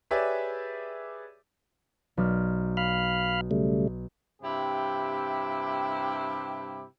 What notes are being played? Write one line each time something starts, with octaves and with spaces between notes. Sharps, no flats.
G4 G#4 B4 C#5 D5 E5
B1 D5 F6
F5 B5 F6 B6
C#3 G3 A3
G2 C3 E4 G4